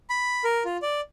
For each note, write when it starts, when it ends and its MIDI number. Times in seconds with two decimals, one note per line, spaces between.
0.10 0.44 83
0.44 0.63 70
0.65 0.77 65
0.82 1.01 74